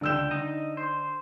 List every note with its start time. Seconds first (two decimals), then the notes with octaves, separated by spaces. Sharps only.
0.01 C#2 D3 G5 E6 E7
0.31 D#4 D#5
0.77 C5